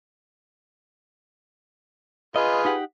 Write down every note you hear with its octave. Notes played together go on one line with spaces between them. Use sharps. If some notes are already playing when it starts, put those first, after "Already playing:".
F4 G#4 B4 D#5
D#4 G4 F#5